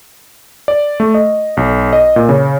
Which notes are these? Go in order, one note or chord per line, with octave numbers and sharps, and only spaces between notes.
D5
A3
D#5
B1
D#5
A#2
C#3